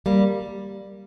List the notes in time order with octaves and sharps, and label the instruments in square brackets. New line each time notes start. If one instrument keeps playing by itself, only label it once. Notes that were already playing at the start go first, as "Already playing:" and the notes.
[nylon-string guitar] G3 A#3